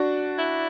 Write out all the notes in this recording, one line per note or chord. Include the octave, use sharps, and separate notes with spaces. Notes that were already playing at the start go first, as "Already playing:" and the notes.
Already playing: D4 F#4
E4